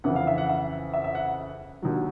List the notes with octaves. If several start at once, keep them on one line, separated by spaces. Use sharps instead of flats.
F2 C#3 E3 F#5
F5
E5
F#5
E5
E5
E5
F#5
D#2 D3 F#3